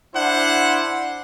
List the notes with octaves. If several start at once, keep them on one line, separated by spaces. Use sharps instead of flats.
D4 E4 C5 F#5